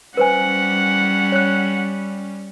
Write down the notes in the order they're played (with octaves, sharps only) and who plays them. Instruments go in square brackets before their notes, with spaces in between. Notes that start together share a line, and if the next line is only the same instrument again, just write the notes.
[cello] G3 C#4 [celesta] B4 C5 G#5 [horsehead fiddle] F#5
[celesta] C#5 F#6